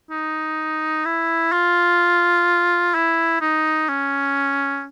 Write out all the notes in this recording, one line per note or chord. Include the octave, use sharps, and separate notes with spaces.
D#4
E4
F4
E4
D#4
C#4